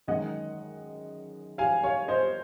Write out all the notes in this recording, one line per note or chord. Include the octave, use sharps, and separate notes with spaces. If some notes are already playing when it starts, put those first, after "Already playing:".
F#2 D#3 G#3 D#5 F#5
F5 G#5
C#5 F5
C5 D#5